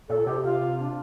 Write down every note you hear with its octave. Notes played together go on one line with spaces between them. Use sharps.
A#2 A4
C3 G4
F4
D4